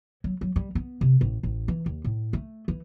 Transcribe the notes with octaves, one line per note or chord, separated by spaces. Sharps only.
F#3
F#3
G3
B3
C3
A1
A1
E3
D#2
A2
A3
E3